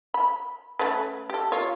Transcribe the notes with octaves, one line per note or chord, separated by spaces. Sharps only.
B5
A3 C#4 B4
G4 A4
F4 C#5